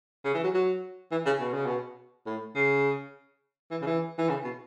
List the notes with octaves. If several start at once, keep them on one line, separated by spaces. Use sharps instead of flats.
C#3
E3
F#3
F#3
E3
C#3
B2
C#3
B2
A2
C#3
E3
C#3
E3
E3
C#3
B2